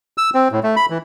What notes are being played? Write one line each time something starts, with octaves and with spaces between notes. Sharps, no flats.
E6
C4
A2
A3
B5
E3